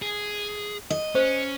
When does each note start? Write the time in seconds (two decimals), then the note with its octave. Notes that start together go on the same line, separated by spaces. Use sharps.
0.02 G#4
0.90 D#5
1.15 C#4 C5